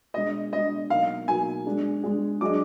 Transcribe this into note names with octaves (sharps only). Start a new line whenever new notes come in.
B2 G#3 D4 D#5
B2 G#3 D4 D#5
B2 F#3 A#3 D#4 F5
B2 F#3 A#3 D#4 G#5
G#3 D4 G#4
G#3 D4 G#4
F#3 D4 G#4 D#5 D6